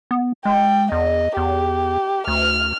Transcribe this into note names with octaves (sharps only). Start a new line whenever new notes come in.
B3
G#3 G5
E2 D#5
E2 G4
D2 F6